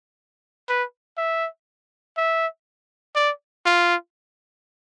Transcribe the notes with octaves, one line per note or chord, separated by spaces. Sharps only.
B4
E5
E5
D5
F4